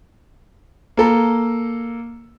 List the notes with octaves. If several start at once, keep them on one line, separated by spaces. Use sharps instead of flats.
A#3 A4 A#5